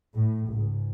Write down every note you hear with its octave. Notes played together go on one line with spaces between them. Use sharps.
A2
C#2 G#2